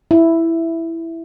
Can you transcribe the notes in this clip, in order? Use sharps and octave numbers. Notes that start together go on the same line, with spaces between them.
E4